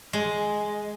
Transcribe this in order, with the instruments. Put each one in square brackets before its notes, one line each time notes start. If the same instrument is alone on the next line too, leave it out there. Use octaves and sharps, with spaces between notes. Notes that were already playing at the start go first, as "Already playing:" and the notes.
[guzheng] G#3